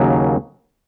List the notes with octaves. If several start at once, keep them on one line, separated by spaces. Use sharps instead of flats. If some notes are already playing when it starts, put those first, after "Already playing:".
Already playing: D#2 C#3 F#3 A#3